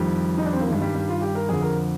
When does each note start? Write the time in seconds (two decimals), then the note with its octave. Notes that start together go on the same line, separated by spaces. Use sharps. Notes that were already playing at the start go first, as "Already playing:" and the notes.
Already playing: F2 D#3 G3
0.38 D#4
0.46 D4
0.53 C4
0.61 A#3
0.68 G2 D#3 G#3
0.82 G3
0.95 G3
1.09 F4
1.22 G4
1.35 A#4
1.49 F2 D3 G#4
1.62 A#4